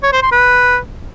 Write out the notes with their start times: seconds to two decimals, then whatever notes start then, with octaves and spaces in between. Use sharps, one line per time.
0.03 C#5
0.13 C5
0.22 C6
0.32 B4